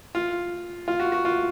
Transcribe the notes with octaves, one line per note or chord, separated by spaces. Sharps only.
F4
F4
F#4
F#4
F4